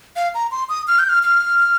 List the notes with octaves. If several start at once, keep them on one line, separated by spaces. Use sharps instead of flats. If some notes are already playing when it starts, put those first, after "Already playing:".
F5
A#5
C6
D#6
F6
G6
F6
F6